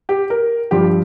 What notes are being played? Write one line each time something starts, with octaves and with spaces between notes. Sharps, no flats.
G4
A#4
G2 F3 G4